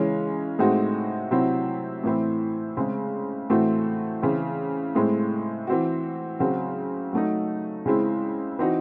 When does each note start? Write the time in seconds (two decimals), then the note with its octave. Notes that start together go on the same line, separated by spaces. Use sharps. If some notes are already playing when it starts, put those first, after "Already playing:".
Already playing: C#3 E3 G#3 C#4
0.59 A2 G#3 C4 D#4 F#4
1.31 C3 F#3 C4 E4
2.04 A2 E3 C4 E4
2.77 C#3 G#3 C4
3.50 A2 E3 A3 C4 F#4
4.22 C#3 E3 C4
4.95 A2 G#3 C4 E4
5.67 E3 C4 F#4
6.40 C#3 F#3 C4 F#4
7.13 F#3 A3 D#4
7.86 C#3 G#3 C4 E4
8.59 E3 C4 D#4 F#4